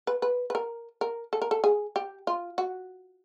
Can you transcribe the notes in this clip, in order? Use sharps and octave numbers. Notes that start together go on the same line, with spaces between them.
B4
B4
B4
A#4
A#4
A4
A#4
A4
G#4
G4
F4
F#4